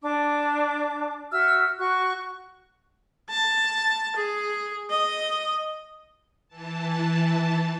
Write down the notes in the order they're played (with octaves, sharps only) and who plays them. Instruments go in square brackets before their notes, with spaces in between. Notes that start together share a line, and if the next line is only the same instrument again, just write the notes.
[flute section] D4 D6
F#4 E5 E6 F6
F#4 C#6 F#6
[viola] A5
G#4
D#5
[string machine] E3 A5